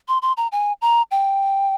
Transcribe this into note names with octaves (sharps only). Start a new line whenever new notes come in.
C6
C6
A#5
G#5
A#5
G5